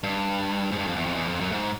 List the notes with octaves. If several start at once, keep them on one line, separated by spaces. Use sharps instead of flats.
G2
G#2
G2
F2
E2
F2
E2
F2
F#2
G#2